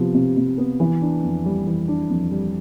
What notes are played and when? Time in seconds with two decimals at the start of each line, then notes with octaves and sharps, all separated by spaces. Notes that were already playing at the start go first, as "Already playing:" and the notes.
Already playing: C3 F3 B3
0.14 C3
0.37 C3
0.58 B3
0.80 E3
1.02 D4
1.23 F2
1.45 G3
1.67 E3
1.88 D4
2.10 F2
2.31 G3